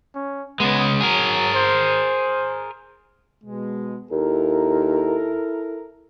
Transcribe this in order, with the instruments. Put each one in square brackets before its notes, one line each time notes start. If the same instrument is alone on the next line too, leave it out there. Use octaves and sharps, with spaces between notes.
[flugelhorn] C#4
[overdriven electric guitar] C#3 G#3 [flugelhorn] B3
[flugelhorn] F#3 [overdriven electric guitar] G#4 A#4
[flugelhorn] C5
[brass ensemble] B2 G#3
[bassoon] D#2 [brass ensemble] E4 A4 A#4